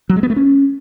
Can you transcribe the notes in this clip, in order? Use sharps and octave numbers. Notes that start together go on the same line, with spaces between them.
F#3
G#3
B3
A3
C#4